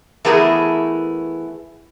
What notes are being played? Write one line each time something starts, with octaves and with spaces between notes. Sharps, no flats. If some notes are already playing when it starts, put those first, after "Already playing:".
E3 A3 B3 E4 G#4 A#4